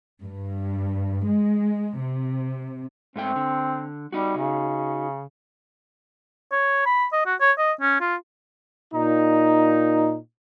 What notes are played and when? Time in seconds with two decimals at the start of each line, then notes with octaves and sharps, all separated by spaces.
0.20 G2
1.27 G#3
1.99 C3
3.16 G#2 A3 C4 G5
3.36 D3
4.12 G3 D#4 F#4
4.37 C#3
6.52 C#5
6.86 B5
7.13 D#5
7.26 F#4
7.41 C#5
7.58 D#5
7.81 C#4
8.00 F4
8.94 A#2 D#4